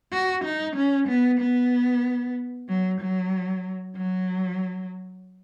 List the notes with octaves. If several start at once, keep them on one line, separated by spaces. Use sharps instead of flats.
F#4
D#4
C#4
B3
B3
F#3
F#3
F#3